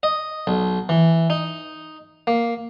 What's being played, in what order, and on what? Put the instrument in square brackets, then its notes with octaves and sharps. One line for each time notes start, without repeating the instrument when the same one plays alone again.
[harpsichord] D#5
B1
E3
D#4
A#3